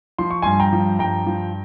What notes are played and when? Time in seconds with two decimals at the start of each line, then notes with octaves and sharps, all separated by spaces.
0.18 F3 C6
0.30 C#6
0.42 G2 G#5 C6
0.60 G5 A#5
0.73 F3
0.99 G2 G5 A#5
1.27 F3